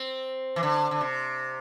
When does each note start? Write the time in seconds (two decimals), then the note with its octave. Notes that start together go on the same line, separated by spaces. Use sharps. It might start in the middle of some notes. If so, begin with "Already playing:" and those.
Already playing: C4
0.56 E3
0.63 D3
0.91 D3
1.01 C3